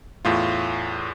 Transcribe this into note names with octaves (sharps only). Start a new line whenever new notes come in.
E2 A2 F4